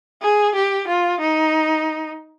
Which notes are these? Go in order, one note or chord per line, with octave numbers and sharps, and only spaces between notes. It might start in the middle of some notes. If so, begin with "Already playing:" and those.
G#4
G4
F4
D#4